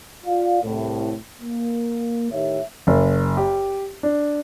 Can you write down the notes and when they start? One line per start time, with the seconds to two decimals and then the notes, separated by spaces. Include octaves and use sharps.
0.25 F4 D5 F5
0.63 C2 A2
1.42 A#3
2.32 A2 D#3 G4 C#5 E5
2.87 F#1
3.37 G4
4.03 D4